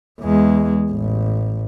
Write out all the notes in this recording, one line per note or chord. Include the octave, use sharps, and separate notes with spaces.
E2 G#3
A1